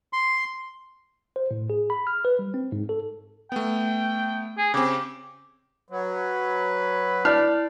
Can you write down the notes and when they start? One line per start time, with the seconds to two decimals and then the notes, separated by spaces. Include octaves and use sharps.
0.13 C6
1.36 C5
1.51 A2
1.70 G#4
1.90 B5
2.07 F6
2.25 B4
2.39 G3
2.54 C4
2.72 G#2
2.89 A4
3.52 A3 B3 G5
4.58 G#4
4.74 C#3 C4 G4
5.90 F#3 B4
7.25 E4 D5 F6